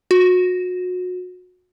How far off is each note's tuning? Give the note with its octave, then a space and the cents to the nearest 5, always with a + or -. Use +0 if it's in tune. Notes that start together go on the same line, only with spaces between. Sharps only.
F#4 -30